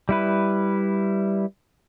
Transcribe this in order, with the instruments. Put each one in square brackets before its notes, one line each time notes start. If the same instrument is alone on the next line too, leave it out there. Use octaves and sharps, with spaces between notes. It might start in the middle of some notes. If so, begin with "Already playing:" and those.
[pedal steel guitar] G3 E4 B4